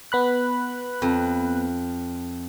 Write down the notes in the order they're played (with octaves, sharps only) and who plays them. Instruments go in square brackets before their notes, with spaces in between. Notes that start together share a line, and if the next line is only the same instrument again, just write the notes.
[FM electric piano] B3 B5 F#6
[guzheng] F2